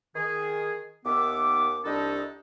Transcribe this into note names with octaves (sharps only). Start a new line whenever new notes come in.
D#3 G#4
D#2 D#3 B3 E5 D6
C2 G3 D4 D#4 A4 D#5